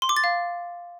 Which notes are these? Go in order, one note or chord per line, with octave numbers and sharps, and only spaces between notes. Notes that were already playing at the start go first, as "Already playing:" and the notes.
C6
D6
A6
F5